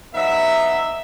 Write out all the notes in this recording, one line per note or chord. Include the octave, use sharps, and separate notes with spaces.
F#3 B3 D#4 E5